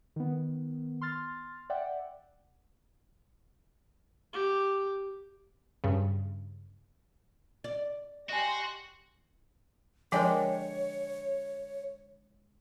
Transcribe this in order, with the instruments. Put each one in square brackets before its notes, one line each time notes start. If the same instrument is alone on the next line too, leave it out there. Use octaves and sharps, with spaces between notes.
[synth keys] D#3 B3
C6 F6 A6
D5 E5 F#5 G5
[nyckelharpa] G4
[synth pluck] G2 C#3
[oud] D5
[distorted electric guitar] F#4 [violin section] G4 C6 A#6 [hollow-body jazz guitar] D#5 G#5
[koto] D3 G#3 G4 [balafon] F3 A#4 [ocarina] C#5